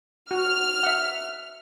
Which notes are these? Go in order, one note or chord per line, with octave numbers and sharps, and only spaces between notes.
F#4 F6
E5 F#5